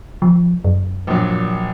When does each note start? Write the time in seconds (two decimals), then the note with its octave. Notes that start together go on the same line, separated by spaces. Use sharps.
0.22 F3
0.64 F#2
1.07 A#1 A#2 F#3